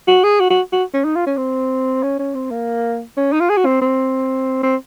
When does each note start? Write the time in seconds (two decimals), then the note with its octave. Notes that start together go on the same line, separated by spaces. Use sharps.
0.07 F#4
0.24 G#4
0.40 F#4
0.50 F#4
0.72 F#4
0.94 C#4
1.05 D#4
1.16 F4
1.26 C#4
1.37 C4
2.03 C#4
2.19 C#4
2.35 C4
2.51 A#3
3.17 C#4
3.32 D#4
3.40 F4
3.49 G#4
3.57 F#4
3.65 C4
3.81 C4
4.63 C4